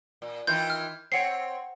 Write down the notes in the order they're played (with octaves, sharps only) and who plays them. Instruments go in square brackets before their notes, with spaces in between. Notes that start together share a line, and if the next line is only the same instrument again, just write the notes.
[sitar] A#2
[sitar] D#3 E3 F4 [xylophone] G6
[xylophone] F6
[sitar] C4 C#5 [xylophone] F#5 C7